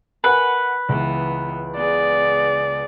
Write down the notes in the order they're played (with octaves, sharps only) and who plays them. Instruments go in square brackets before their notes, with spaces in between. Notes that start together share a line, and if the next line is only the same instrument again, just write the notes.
[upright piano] A#4 F#5 G#5 [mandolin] B4
[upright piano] C#2 [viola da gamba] E3 B3
[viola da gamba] B3 G#4 [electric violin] D5